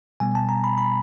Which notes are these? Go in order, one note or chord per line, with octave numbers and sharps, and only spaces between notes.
B2 G3 B3 G#5
A5
A#5
B5
B5